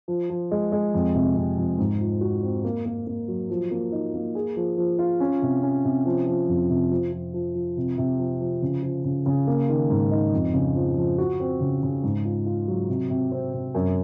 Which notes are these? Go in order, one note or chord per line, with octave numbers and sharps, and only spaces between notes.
F3
F3
G#3
G#3
F2
C3
C3
F2
G#2
F3
F#4
C4
A#3
A#3
A#3
F#3
F3
A#3
D#4
A#3
G#4
F3
F3
F4
C#4
C3
C#4
C3
F3
F3
F2
C3
F3
F3
F3
F3
C3
C3
F3
F3
C#3
F3
C#3
C#3
A#3
D#3
G#2
D#4
F2
C#3
F3
F3
F#4
C4
C#3
C#3
G#2
F4
F4
F#3
C3
C3
C4
C3
F#2